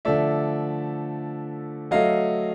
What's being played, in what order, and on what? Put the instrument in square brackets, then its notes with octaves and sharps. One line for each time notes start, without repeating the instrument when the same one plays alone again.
[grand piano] D3 F3 A3 D5 E5
F#3 A3 D#5 F5